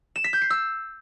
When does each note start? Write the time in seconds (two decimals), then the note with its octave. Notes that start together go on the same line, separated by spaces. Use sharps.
0.16 E7
0.24 B6
0.33 G6
0.42 C7
0.50 E6